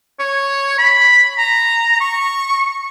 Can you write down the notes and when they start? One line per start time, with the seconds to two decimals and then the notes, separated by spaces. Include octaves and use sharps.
0.19 C#5
0.78 B5
1.38 A#5
2.00 C#6